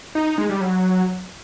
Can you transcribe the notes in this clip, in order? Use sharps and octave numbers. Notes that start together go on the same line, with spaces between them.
D#4
D#4
G#3
G3
F#3